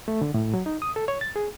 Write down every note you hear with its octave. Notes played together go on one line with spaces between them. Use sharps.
A3
D3
A2
F#3
D#4
D#6
A4
C#5
A6
G#4